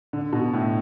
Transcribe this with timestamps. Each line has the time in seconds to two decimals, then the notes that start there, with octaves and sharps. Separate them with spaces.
0.13 D3
0.33 B2
0.54 A2